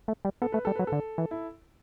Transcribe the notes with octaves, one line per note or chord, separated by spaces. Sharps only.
A3
G3
B3 A4
A3 B4
G3 A4
F#3 B4
D3 A4
E3
E4